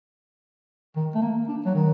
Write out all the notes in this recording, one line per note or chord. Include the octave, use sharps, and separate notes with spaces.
D#3
A3
A#3
D4
F#3
D#3